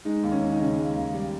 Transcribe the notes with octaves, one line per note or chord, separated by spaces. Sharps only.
G#3 D#4
D#2
C#4
D#2
D#4
C#3 C#4
G#3
D#2
G3